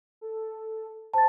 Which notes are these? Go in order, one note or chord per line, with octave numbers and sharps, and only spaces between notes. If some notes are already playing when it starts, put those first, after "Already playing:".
A4
C5 A5 A6